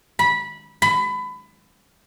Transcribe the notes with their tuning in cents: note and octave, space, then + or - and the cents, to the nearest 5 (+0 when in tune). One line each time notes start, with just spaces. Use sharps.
B5 -15
B5 +25